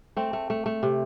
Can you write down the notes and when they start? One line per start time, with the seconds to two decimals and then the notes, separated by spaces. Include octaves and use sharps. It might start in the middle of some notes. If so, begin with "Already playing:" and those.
0.17 A3 C4
0.33 A3
0.50 A3
0.66 A3
0.83 C3